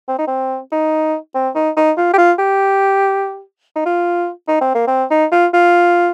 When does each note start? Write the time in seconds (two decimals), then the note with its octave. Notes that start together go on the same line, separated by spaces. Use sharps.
0.08 C4
0.18 D#4
0.27 C4
0.72 D#4
1.35 C4
1.55 D#4
1.77 D#4
1.98 F4
2.14 G4
2.18 F4
2.39 G4
3.76 D#4
3.86 F4
4.48 D#4
4.61 C4
4.75 A#3
4.87 C4
5.11 D#4
5.32 F4
5.54 F4